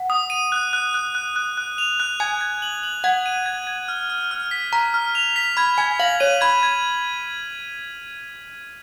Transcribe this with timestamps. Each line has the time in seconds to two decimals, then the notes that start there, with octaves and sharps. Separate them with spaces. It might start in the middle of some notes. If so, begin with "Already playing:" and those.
Already playing: F#5
0.10 D#6
0.30 D#7
0.52 F#6
0.73 F#6
0.94 F#6
1.15 F#6
1.36 F#6
1.58 F#6
1.78 F7
2.00 F#6
2.20 G#5 G#6
2.41 G#6
2.62 F#7
2.83 F#7
3.04 F#5 G#6
3.26 D#7
3.46 G#6
3.67 G#6
3.88 F6
4.10 F6
4.31 F6
4.51 B6
4.73 A#5 B6
4.94 F6
5.15 F7
5.36 B6
5.57 B5 G#6
5.78 G#5 G#6
6.00 F5 F#7
6.20 C#5 D#7
6.41 B5 G#6
6.63 G#6